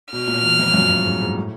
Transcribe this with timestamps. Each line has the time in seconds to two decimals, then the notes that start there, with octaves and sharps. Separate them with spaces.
0.12 B2 F6
0.28 A#2
0.43 E2
0.59 F2
0.74 F#2
0.89 G2
1.05 G#2
1.21 G#2
1.36 A2